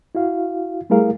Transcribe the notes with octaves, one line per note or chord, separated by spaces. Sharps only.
E4 F#4 F5
G3 A3 E4 G#4 A#4 F5